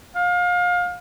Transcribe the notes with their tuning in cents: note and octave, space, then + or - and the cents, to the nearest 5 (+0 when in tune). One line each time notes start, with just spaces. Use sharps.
F5 +30